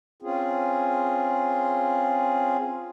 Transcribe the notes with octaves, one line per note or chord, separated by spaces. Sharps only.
C4 C#4 F4 G#4